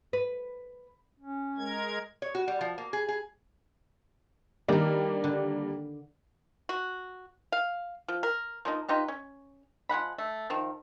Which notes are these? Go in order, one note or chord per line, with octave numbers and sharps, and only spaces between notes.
B4
C#4
G#3 A#4 G#6
C#5
F#4
G3
F3
A#3
G#4
G#4
D#3 G3 A#3 D4 A#4
D3
F#4
F5
F3
A#4
F3 A#3 D#4
D#4 F4 G4 B4
C#4
F3 G#3 F#5 B5
A3
D#3 F3